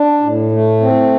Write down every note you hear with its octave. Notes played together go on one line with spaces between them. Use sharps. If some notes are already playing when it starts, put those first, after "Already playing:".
Already playing: D4
A2
A3
C4